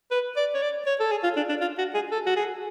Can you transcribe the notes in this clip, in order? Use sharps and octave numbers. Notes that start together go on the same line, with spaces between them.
B4
D5
C#5
D5
C#5
A4
G#4
F4
D4
D4
F4
F#4
G#4
A4
F#4
G#4